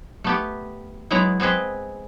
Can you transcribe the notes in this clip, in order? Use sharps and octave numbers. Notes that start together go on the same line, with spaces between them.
A3 B3 G4
F#3 G#3 B3 E4 A#5
B3 C4 G#4 B4 D#5